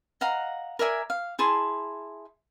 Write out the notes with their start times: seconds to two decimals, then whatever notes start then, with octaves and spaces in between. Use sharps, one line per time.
0.21 D#5 F5 F#5 A#5
0.79 A#4 D5 E5 G#5
1.10 F5
1.39 E4 G#4 A5 C6